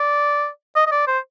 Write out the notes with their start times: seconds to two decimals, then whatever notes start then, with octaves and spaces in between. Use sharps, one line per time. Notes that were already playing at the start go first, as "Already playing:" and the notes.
Already playing: D5
0.76 D#5
0.87 D#5
0.92 D5
1.07 C5